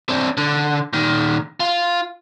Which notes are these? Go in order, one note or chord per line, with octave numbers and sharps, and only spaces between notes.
C4 D4
D3
A#2 D#3
F4